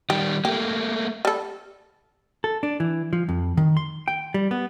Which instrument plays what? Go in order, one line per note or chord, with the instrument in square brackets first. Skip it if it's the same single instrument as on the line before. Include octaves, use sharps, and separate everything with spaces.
[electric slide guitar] D#3 G3 [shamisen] G4
[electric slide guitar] A3 A#3 [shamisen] G4
[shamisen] G3 A4
[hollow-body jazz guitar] A4
D4
E3
F3
F2
D#3
C6
G5
G3
B3